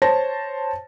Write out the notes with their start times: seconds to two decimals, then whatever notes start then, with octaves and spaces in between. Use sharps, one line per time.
0.02 C5 C#5 A5 A#6